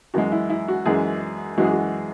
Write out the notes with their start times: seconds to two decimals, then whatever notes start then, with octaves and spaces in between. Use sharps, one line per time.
0.14 F#2 E3 G#3 F#4
0.32 E4
0.50 E4
0.68 F#4
0.86 F#2 E3 G#3 G#4
1.58 F#2 E3 G#3 F#4
1.64 G#4
1.72 F#4